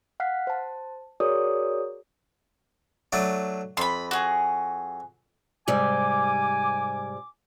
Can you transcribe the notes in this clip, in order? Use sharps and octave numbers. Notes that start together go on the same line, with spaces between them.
F5 F#5 F6 F#6 B6 C7
C5 A5
F#4 G#4 A#4 C#5 D5 D#6
F#3 A3 D4
F2 B5 C6
F#4 G#4
G#2 C3 G3 G#5 D6